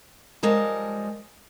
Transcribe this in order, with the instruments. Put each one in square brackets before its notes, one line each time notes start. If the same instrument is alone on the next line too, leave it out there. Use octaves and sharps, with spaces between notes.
[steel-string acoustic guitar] F3 G3 G#3 A#4 A5